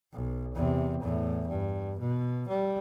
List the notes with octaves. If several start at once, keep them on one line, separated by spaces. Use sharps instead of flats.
B1
E2 C3
E2 A2
G2
B2
G3